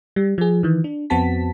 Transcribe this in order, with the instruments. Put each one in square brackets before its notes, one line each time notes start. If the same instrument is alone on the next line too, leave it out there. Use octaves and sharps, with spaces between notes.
[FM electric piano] G3
F3 G#4
D#3 E3
D4
F2 B3 C4 F#4 A5 B6